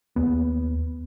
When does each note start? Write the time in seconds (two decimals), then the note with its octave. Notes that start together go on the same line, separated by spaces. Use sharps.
0.16 D#2 B3